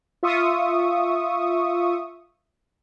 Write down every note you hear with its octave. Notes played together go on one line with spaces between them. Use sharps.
F4 E5 C#6 D#6